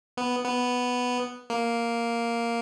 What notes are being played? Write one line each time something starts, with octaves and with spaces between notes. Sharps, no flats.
B3
B3
A#3